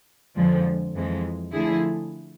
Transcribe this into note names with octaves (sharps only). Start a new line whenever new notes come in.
F2 D3 F3 G#3
F2 E3 G#3
D3 F3 A3 E4 G#4